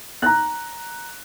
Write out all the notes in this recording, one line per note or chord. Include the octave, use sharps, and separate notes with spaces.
A#5 F#6